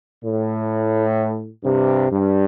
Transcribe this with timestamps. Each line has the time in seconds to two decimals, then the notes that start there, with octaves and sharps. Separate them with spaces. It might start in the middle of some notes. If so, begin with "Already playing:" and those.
0.23 A2
1.64 G2 C3
2.11 G2